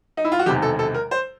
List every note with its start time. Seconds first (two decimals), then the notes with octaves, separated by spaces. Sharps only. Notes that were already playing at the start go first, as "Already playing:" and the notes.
0.17 D#4
0.25 E4
0.32 F4
0.39 F#4
0.46 E1 E2 C3 D#3 G4
0.62 A4
0.79 A4
0.94 A#4
1.11 C5